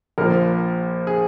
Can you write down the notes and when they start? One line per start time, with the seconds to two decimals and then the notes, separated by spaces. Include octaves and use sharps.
0.18 A#1 A#2 F3 A#4
1.07 G#4